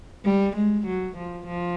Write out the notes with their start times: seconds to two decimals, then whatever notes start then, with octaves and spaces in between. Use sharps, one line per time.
0.25 G3
0.56 G#3
0.86 F#3
1.16 F3
1.47 F3